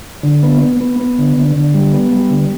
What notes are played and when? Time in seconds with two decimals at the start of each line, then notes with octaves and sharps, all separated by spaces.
0.23 D3
0.43 B3
0.61 B3
0.80 B3
1.00 B3
1.18 D3
1.37 D3
1.56 D3
1.74 G3
1.93 B3
2.12 G3
2.30 D3